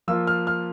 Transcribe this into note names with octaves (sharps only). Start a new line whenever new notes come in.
F3 A#3 F4 E6
F6
F6